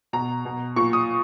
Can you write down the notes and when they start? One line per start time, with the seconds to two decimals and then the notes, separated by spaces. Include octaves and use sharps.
0.13 B2 A#5
0.45 B2
0.76 A#2 C#6
0.93 D#6